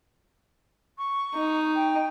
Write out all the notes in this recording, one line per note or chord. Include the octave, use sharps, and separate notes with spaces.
C#6
D#4
G5